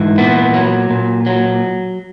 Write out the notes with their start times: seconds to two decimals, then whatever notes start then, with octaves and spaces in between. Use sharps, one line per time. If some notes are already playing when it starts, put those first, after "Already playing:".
Already playing: G#2 E3
0.18 A#2 B3
0.54 F#3
0.90 A#2
1.26 F#3